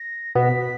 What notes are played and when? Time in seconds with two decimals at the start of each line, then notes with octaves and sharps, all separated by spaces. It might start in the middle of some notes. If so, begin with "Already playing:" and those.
Already playing: A#6
0.35 B2 B3 B6